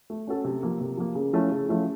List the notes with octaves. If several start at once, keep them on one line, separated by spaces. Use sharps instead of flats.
A3
C#4 F#4 A4
C3
F3 A#3
C3
F3 A#3
C#3
F3 A3 C#4 E4
C#3
F3 A3 C#4 E4